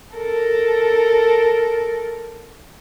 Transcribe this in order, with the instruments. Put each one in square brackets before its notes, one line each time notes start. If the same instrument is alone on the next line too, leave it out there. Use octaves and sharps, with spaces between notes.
[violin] A4 A#4